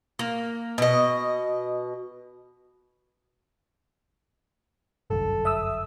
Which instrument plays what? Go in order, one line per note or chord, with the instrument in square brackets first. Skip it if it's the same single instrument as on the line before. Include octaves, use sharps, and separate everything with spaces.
[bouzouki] A#3
B2 D#5
[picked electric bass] G1 C2 F#2 [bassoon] A4
[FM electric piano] E5 D#6 E6